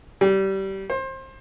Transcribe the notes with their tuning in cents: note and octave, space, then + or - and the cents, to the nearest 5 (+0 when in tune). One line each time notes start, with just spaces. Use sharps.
G3 -20
C5 +25